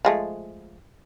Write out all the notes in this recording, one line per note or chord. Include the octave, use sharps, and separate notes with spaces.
F3 G#3 A3